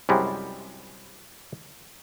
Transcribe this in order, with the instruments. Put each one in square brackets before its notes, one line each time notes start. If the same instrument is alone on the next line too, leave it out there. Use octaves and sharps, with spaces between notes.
[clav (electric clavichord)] C2 F#2 G3 G#3